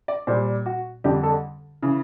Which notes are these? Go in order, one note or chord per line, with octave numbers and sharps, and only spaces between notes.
D5
A#2 G3 C5
F#4
F2 D3 G3 G4
A4
C#3 E3